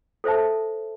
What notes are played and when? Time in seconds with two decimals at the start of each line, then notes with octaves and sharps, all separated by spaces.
0.24 A4 C5 E5 A5